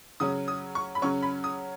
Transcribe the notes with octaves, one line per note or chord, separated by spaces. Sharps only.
C#3 F#3 C#4 D#6
D#6
C#6
B5
C#3 F#3 C#4 C#6
B5
D#6